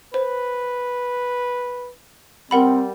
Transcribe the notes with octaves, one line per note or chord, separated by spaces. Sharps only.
B4 C5
G3 C4 A#4 F#5 B5